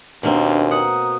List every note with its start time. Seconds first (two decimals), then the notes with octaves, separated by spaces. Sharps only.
0.23 D#2 B2 A#3 C4 D4
0.71 F#5 A#5 D#6